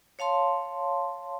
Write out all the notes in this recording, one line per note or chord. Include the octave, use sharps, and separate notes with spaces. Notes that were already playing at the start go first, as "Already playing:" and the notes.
C#5 F5 A5 C6